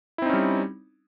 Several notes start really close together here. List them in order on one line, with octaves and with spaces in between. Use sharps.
E4 C4 D#4 C#4 G3